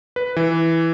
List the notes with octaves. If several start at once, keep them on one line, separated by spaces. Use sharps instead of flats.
B4
E3